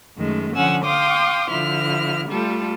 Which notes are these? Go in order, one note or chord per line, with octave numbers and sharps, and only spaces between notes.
F#2 D#3 G#3 A3
D3 F3 C#4 F#5 G#5 E6
F5 G5 C6 D6 D#6
D3 F3 E4 F6
G3 A3 F4 A4